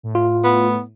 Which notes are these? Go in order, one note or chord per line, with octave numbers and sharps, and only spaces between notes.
A2
F4
B3